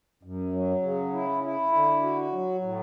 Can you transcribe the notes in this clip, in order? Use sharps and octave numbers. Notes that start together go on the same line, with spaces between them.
F#2
F#3
C#3
E4
E4
D3
F#4
F#3
A2